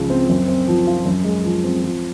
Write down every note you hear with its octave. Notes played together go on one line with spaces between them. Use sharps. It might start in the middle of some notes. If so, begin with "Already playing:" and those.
Already playing: C#2 C#3 F3
C4
F#2
C4
F3
F4
F#2
G#3
F3
C4
F3